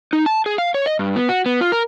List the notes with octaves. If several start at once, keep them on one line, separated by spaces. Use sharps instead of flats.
D#4
A5
G#4
F5
C#5
D#5
G2
B3
F#4
B3
F4
A#4